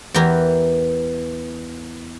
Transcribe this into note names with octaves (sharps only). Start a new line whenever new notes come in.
E2 E3 G4 A#4 B4